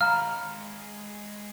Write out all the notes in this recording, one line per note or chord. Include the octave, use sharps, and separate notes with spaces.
G#3 F5 A#5 B5 F6